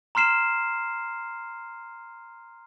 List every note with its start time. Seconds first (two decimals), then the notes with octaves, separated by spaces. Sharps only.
0.15 A#5 C6 F6 C7 E7